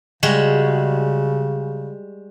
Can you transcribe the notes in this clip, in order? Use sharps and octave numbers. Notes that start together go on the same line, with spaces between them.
C#3 G3 G#3 F#4